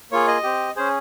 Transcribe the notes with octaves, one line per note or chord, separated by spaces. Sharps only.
A#3 F4 G#4 C#5
D#5
C4 G4
C#4 G#4 C5